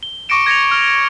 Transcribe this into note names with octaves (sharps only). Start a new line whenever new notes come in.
G7
C#6 D6 A#6 C#7 D7 E7
G#6 A#6 C#7 F7
F6